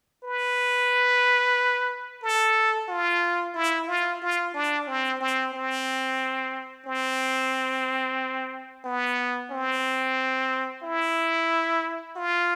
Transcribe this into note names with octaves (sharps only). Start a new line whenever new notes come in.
B4
A4
F4
E4
F4
F4
D4
C4
C4
C4
C4
B3
C4
E4
F4